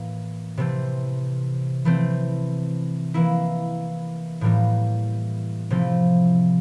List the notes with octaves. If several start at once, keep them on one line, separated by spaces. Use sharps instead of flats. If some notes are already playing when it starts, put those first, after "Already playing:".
Already playing: A2 E3 A#3
C3 E3 A3 C4
E3 A3 C4
E3 A#3 E4
A2 E3 G3 A#3
C3 F3 A3 E4